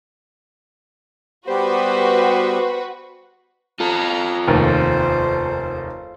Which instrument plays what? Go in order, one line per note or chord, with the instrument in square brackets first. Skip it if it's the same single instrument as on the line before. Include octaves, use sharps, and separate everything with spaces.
[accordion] G3 B3 G4 [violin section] F#4 B4 [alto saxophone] C5
[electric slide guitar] F4 A4 [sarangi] A#5
[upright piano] F1 D#2 [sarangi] C5